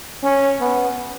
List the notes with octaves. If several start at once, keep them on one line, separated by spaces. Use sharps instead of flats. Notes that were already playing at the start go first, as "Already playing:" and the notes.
C#4
B3